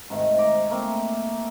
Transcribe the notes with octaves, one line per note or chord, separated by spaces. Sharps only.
G#2 C3 D#3 A3
D#4 A#5 D6
A3 A#3 C4